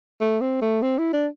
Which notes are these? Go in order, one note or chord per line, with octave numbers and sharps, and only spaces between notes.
A3
C4
A3
C4
E4
D4